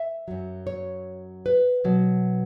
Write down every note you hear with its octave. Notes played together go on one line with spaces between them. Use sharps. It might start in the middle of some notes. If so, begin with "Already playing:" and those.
Already playing: E5
F#2 F#3
C#5
B4
B2 F#3